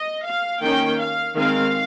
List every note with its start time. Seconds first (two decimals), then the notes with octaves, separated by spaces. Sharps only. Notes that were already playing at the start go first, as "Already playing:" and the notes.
Already playing: D#5
0.25 F5
0.63 D#3 A#3 C#4 G5
1.00 F5
1.36 D#3 G#3 C4 F5